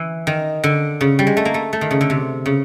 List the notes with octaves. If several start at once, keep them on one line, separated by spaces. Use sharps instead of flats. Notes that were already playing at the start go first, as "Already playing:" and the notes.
Already playing: E3
D#3
D3
C#3
G3
G#3
A3
A#3
A3
A3
D#3
C#3
D3
C3
C#3